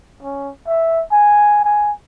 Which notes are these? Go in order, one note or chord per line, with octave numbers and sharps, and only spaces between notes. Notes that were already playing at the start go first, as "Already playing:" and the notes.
C#4
E5
G#5
G#5